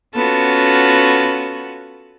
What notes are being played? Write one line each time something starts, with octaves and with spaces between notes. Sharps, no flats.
B3 C#4 F4 F#4 A4